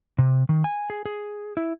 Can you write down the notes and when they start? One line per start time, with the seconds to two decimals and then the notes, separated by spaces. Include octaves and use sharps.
0.18 C3
0.49 D#3
0.64 G#5
0.90 G#4
1.06 G#4
1.57 E4